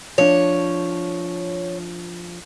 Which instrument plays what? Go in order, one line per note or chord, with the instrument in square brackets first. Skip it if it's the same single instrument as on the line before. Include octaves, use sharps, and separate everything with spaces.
[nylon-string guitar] F3 D4 [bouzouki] C#5